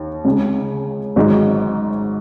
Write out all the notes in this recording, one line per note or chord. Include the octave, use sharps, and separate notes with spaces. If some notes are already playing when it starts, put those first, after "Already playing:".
Already playing: D#2
C#2 C#3 G#3
G#1 G#2 F#3 D#4